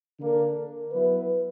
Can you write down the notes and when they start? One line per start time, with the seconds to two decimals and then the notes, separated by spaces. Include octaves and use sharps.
0.19 D3 A#3 D4 A#4
0.91 F#3 B3 E4 B4